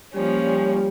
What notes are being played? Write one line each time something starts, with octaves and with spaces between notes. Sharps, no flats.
F3 G3 A#3 C#4
G3